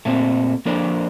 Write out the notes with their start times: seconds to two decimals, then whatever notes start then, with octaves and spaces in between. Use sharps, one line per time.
0.05 A#2 A3 C4
0.65 F3 A#3 D4 A4 C5